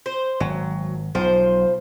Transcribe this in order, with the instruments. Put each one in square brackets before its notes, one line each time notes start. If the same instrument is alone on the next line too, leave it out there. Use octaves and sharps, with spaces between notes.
[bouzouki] C5
[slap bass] G#1 [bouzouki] F#3
[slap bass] B1 [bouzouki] F3 C5